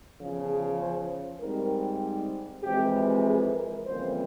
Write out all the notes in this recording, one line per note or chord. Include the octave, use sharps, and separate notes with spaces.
E2 C#3 F3
G#4
C5
G#2 G3 C4 A#4
F2 C3 E3 G#3 G4
G#4
A#4
F2 C#3 E3 G3 A#3 C5